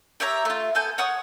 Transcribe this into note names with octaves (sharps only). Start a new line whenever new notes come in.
G4 C#5 E5 A#5
A3 F4
B3 A4 G#5 G6
C#5 F#5 C#6 D#6